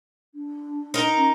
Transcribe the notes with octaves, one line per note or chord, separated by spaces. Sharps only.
D4
D#4 A#4
C#4